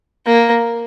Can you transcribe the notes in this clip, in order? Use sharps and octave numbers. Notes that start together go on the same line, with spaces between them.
A#3